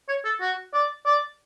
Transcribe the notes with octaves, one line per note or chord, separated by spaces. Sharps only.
C#5
A4
F#4
D5
D5